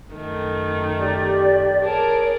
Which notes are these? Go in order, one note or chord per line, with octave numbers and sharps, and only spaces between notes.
F#2 D#3 A3
G4 D5
G#4 A#4 C#5 D5 A5